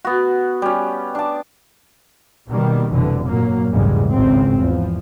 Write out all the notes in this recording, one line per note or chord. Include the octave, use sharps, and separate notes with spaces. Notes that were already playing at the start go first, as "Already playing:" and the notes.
B3 F#4
G3 C#4
D4 A5
B2 D#3 G3 A#3
F1 C2 B2 D3 E3
G2 A#2 F#3 A#3
A#1 E2 G#2 C#3 G3 G#3
G#1 C#2 A2 C#3 C4
E2 F3